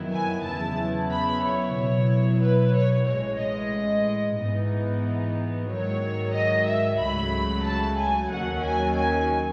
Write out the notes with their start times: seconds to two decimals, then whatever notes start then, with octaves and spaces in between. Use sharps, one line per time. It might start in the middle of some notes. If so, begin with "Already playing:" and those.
Already playing: F#2 D#3 F#3 B3 E4
0.14 G#5
0.45 E2 C#3 F#3 B3 E4 A5
1.11 B5
1.44 C#5
1.77 B2 F#3 B3 E4
2.42 B4
2.75 C#5
3.07 A1 A2 G#3 C#5
3.40 D#5
4.38 G#2 E3 B3 D#4
5.69 G#2 D#3 F#3 C#5
6.34 D#5
6.67 E5
7.00 C#2 C#3 F#3 A3 B5
7.66 A5
7.97 G#5
8.30 D#2 D#3 F#3 C#4 F#5
8.63 G#5
8.97 G#5